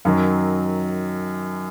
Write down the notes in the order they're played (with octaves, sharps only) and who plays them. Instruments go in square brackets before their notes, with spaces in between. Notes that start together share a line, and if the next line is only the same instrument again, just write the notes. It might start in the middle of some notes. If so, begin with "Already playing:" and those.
[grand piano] F#2 D#3 F#3